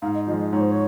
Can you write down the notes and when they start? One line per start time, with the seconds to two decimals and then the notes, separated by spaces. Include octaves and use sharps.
0.02 G#2 F5
0.14 D#5
0.27 F3 D#5
0.32 G#3
0.40 D#5
0.53 G#2 C#5
0.60 C5
0.70 C#5